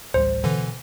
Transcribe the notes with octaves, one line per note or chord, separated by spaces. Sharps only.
A1 D2 G3 C5
B2 D3 E3